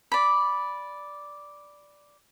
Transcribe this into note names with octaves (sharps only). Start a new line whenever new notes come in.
D5 B5